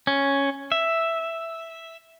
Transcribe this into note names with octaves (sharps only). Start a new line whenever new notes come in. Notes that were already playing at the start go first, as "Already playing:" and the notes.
C#4
E5